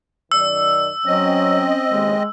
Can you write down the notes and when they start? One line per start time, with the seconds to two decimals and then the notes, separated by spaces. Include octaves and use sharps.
0.32 F#2 D#3 D5 E6
1.06 F#3 C4 C#4 D#5
1.90 D#2 A2 C#3 G#3